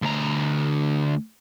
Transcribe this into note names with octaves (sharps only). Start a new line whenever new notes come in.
D2 A#5